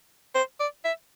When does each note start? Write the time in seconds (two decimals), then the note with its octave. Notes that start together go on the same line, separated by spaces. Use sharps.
0.35 C5
0.60 D5
0.85 E5